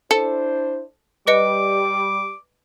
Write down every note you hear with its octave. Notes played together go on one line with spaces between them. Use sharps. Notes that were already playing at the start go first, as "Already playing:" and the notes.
D4 E4 A4 C5 C#7
G3 B4 D#5 D6 C#7